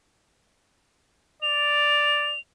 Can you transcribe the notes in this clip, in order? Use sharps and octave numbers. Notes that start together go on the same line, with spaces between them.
D5 F7